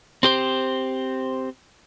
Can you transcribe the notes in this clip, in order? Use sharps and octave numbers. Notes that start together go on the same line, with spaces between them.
C4 G4 C5